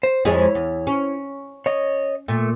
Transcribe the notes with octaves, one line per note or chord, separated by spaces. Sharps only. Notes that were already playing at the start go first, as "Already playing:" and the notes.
C5
F2 G#3 E4 G#4 C#5
E2
C#4
C#5 D#5
A#2 A3